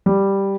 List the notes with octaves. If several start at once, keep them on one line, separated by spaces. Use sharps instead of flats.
G3